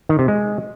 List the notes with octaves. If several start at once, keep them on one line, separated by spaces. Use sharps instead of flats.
D#3
C3
G#3